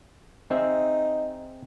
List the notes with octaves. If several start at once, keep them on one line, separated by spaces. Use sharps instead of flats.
C4 D#4 G#4 E5